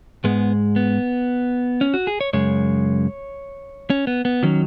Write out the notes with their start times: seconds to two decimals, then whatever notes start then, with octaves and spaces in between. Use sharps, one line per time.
0.24 G#2 G#3 B3
0.76 B3
1.81 C#4
1.94 F#4
2.07 G#4
2.21 C#5
2.33 F#2 C#3 G#3 C#5
3.90 C#4
4.07 B3
4.25 B3
4.43 D#3 F#3 C#4